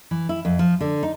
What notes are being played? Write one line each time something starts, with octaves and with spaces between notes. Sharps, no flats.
E3
E4
F2
F3
D3
D#4